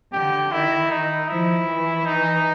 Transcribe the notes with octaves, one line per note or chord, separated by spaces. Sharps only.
D3 G4
D#3 E4
D#4
F3 E4
E3
E3 D#4